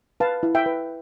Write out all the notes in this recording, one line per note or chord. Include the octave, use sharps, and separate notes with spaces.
B4 F5 A5
E4
E5 G5
B4